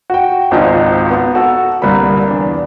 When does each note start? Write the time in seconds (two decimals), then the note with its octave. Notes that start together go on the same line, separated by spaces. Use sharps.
0.10 F#4 G5
0.51 G#1 C#2 G#2 D#4 D#5 A5
1.11 B3
1.35 F#4 A4
1.82 C2 G2 D3 A#3 B5
2.28 E2 D4